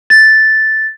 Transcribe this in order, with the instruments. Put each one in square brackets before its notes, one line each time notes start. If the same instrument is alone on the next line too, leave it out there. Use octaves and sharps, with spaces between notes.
[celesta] A6